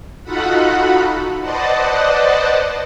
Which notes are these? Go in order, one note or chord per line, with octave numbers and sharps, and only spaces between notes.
D#4 F4 F#4 A4 F#5 B5
B4 C5 D5 D#5 F#5 A5